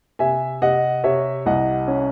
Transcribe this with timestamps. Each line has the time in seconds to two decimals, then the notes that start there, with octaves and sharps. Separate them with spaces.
0.19 C3 E5 G#5
0.62 C3 D#5 F#5
1.04 C3 C#5 E5
1.46 C2 D#5 F#5
1.88 C#4